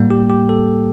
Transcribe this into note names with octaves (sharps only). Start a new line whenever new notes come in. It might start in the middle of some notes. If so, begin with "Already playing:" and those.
Already playing: A2 G3 A#3
G4
G4
A4